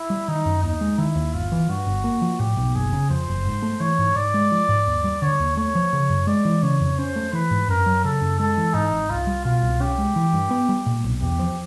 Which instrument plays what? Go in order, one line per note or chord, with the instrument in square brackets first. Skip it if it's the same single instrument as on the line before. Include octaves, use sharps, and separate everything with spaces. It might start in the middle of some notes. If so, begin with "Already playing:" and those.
Already playing: [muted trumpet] E4
[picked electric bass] G3
[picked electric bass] D#3 [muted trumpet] D#4
[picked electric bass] F#2
[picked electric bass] D#2 [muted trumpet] D#4
[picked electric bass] G#3
[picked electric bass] D#3 [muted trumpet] E4
[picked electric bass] D#2
[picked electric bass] G1 [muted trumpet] F4
[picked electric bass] E3
[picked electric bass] G2 [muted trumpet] F#4
[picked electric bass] G1
A#3
F3
[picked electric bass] A2 [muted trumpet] G4
[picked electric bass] B1
[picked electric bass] F#1 [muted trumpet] G#4
[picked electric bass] C#3
[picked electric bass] F2 [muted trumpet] C5
[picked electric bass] F#1
G#2
A3
[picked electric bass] E3 [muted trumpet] C#5
[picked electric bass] G#2
[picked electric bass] G#2 [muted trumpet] D5
[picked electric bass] G#3
F3
G#2
D#2
G3
[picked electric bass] D3 [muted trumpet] C#5
[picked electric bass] D#2
[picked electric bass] A3 [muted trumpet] C#5
[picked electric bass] F3
C#3
F#2
[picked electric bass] G#3 [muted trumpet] D5
[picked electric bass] E3
[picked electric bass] C#3 [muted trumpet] C#5
[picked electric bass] F2
[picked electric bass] C#4 [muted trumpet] C5
[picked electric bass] A3
[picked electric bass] E3 [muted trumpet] B4
[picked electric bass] G#2
[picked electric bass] F#2 [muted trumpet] A#4
[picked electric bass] F#3
[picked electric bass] C#3 [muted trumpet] A4
[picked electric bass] F#2
[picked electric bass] G#3 [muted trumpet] A4
[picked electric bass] E3
[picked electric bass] G#2 [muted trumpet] D#4
[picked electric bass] G#1
[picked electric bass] C2 [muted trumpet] F4
[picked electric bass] G3
[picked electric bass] B2 [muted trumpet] F4
[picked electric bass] C2
[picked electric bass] C#4 [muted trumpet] G4
[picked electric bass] G#3
E3
G2
B3
G3
A#2
B1
[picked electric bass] E2 [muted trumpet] G4
[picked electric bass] F3